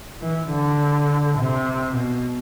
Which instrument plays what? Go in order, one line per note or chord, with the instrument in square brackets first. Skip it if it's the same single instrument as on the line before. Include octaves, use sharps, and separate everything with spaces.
[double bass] E3
D3
C3
B2